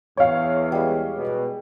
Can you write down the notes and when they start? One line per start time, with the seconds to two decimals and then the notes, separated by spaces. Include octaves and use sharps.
0.17 E2 C#5 F5 G5
0.72 G3 G#3
1.16 B2